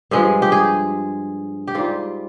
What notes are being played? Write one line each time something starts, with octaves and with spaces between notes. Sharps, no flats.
G2 F3 G#3
G4
G#4
G4
G#2 G3 F4